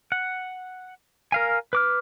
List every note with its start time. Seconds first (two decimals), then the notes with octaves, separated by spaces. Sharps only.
0.12 F#5
1.32 A#4 F5 G#5
1.73 B4 D6 F6